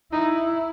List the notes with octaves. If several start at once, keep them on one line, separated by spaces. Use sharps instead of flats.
D#4 E4